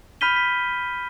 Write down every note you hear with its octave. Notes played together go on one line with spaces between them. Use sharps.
B5 F6 G6 B6 D#7 G7
B6